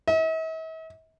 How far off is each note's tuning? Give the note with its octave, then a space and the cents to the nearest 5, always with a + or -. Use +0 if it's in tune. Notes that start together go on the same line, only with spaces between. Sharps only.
E5 -45